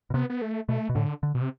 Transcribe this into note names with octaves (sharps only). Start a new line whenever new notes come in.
B2
C3 B3
B3
A3
B2 A3
B2
A2 D3
D3
B2
C3